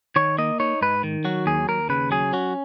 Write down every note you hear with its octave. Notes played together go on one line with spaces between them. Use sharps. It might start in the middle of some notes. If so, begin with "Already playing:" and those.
D#3 C#5
A#3 D#5
D#4 C#5
G#2 B4
D#3
F#3 F#4
D#2 G#4
D#2 A#4
C#3 B4
F#3 G#4
C#4 F#4